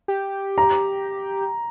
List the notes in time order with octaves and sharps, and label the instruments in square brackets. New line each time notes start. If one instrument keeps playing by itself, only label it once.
[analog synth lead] G4
[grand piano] A#5